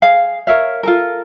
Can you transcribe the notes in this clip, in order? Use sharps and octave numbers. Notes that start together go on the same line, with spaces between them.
G#4 F5
A#4 C#5 E5 F5
F4 A4 A#4